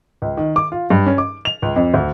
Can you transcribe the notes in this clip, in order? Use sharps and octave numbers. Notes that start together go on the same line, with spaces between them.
C#2
D#3
D6
F4
G2
C#4
D6
F7
C#2
F2
D2